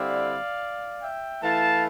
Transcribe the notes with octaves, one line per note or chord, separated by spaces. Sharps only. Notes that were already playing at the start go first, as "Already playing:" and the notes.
Already playing: D3 G3 C4 E4 D5 F5
E5 G5
E3 A3 E4 F5 A5